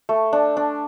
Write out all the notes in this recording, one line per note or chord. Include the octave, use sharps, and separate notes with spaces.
A3
D4
D4